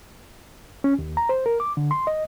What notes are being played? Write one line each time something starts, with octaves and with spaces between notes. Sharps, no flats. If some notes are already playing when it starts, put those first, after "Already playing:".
C#4
D#2
A#5
C5
A#4
D6
D3
C6
D#5